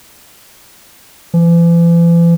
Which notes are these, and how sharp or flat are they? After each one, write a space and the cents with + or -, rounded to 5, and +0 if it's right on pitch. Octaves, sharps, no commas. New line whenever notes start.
E3 +45